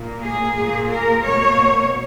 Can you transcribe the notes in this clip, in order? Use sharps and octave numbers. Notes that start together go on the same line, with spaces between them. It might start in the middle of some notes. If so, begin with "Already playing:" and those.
Already playing: A#2 A#3
G#4
A#2 A#3
A#4
B2 A#3 C#5